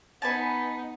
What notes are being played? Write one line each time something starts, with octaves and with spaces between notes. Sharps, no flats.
B3 D#4 B4 G#5 A5